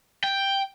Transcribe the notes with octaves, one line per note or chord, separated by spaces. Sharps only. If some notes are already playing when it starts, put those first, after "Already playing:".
G5